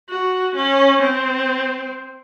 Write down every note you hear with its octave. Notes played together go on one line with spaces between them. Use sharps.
F#4
C#4
C4